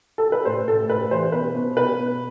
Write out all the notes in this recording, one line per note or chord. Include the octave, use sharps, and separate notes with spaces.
A4
B4
A2 C5
A2 A4
A2 B4
E3 C5
B2 B4
B2
B2 B4
B2